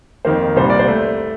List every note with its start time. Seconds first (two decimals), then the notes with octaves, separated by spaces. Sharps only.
0.25 F2 D#3 A#3 C5
0.56 C2 A#2 G3 C5
0.70 D5
0.79 C5
0.88 A3